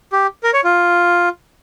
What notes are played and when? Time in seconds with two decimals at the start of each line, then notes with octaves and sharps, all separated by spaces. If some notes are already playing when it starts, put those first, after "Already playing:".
0.12 G4
0.43 A#4
0.54 C#5
0.64 F4